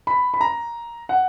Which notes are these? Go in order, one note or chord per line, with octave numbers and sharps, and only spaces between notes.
B5
B5
A#5
F#5